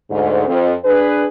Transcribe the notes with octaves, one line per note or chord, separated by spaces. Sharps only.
D2 G#2
F2
D4 G#4 B4